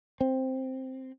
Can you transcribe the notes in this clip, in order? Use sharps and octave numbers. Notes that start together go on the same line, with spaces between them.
C4